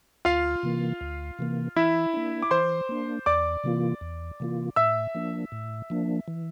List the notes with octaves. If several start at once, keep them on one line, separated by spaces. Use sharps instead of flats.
D2 F4 F5
C3 E3 A#3
D2
C3 E3 A#3
E3 E4 E5
A#3 D4
D6
E3 C5 C6
A#3 D4
E2 D5 D6
C3 E3 A#3 F4
E2
C3 E3 A#3 F4
A2 E5 E6
F3 A#3 D4
A2
F3 A#3 D4
E3